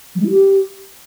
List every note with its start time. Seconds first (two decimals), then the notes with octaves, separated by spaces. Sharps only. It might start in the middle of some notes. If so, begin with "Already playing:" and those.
0.15 F#3
0.20 G#3
0.25 E4
0.30 G4